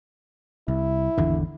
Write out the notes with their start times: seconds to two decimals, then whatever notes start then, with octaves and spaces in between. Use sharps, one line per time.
0.68 C2 E4
1.18 G#1 E2 D3